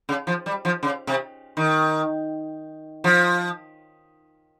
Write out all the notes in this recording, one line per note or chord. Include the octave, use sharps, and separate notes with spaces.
C#3
F3
G3
F3
C#3
C3
D#3
F3